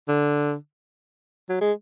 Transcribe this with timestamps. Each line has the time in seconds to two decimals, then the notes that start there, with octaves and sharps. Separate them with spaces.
0.08 D3
1.49 F#3
1.61 G#3